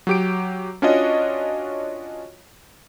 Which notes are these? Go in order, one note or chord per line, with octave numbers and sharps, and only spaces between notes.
F#3 G4 D7
C#4 D4 F4 F#4 C#5 D#5